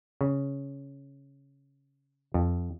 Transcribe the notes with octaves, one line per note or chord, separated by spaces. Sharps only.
C#3
F2